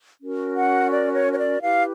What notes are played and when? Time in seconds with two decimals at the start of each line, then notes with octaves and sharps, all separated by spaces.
0.21 C#4 F#4 A#4
0.56 F#5
0.91 D5
1.15 C#5
1.32 C#5
1.38 D5
1.62 E4 G4 B4 F5